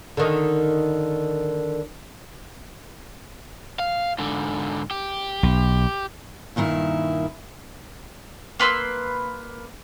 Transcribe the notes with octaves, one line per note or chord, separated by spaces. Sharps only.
D3 D#3
F5
G#2 D3
G4
B1
G2 A#2 D#3 E4
A#3 B4 C6 E6